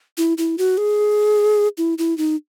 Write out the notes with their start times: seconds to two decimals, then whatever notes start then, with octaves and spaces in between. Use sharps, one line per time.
0.18 E4
0.38 E4
0.58 F#4
0.78 G#4
1.78 E4
1.98 E4
2.18 D#4